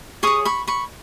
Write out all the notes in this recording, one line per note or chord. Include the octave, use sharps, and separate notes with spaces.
G#4 C#5 C#6 D#6
B5 C#6
B5 C#6